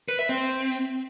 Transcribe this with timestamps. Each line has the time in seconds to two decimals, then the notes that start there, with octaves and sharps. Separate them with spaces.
0.09 B4
0.19 E5
0.29 C4